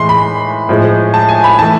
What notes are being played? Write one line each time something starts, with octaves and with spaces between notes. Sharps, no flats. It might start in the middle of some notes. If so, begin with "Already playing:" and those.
Already playing: A2 E3 G#3 C6
B5
A2 F3 G#3
A5
G#5
B5
E3 A3 A5